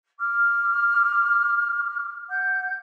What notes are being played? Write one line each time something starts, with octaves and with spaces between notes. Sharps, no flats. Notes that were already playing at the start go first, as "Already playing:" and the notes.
D6 F6
F#5 G6